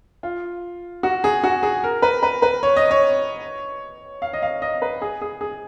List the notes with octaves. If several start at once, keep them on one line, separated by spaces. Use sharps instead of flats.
F4
F#4
G#4
F#4
G#4
A#4
B4
B4
B4
C#5
D#5
C#5
F5
D#5
F5
D#5
B4
G#4
G#4
G#4